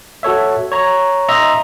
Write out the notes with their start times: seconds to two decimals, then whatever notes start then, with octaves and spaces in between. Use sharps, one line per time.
0.23 F#4 A4 C#5 E5
0.72 C#5 A#5
1.29 D#5 E5 A#5 C6